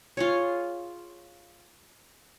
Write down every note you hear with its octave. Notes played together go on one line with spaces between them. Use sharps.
F4 G#4 C#5